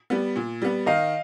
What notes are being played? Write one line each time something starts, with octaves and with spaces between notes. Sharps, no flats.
G3 B3
A#2
G3 B3
D#3 D#5 F5